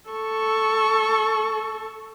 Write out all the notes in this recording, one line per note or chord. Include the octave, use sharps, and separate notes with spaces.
A4 C#6